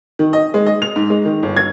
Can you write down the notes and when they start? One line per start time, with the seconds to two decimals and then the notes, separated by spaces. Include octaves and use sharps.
0.19 D#3
0.33 D#5
0.54 G#3
0.66 D#5
0.82 F7
0.96 G#2
1.10 G#3
1.25 D#3
1.43 G1
1.57 G#6